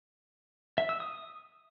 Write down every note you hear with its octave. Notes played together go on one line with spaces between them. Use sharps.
E5
E6
D#6